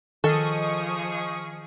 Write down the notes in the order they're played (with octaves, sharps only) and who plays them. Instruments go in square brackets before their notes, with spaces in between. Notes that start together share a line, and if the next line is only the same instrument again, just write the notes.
[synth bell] D#3 D#5 F6 [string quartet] F3 G#4 [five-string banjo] A4 [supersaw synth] C#6 D#6